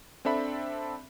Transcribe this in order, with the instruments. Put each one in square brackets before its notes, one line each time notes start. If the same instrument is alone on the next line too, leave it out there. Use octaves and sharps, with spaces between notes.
[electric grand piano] C4 D4 A4 E5 B5